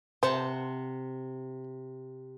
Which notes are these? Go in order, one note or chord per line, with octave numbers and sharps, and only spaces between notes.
C3 C5 F#5 A5